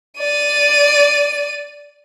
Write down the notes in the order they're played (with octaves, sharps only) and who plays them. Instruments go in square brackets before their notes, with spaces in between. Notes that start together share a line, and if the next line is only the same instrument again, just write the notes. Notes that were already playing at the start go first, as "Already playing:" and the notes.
[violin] D5 D#7